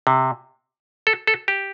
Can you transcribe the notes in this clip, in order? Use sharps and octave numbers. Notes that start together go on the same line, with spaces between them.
C3
A4
A4
G4